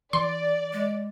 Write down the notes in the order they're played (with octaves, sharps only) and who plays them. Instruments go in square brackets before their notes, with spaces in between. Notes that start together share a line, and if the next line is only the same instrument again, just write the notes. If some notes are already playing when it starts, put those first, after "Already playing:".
[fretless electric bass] E3 [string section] D5 [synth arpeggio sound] C6
[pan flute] G#3